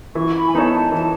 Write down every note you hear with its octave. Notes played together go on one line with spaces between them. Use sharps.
E3 C#6
B5
G#5
B3 D#4 A4 C#5 A5
A5
E3 A5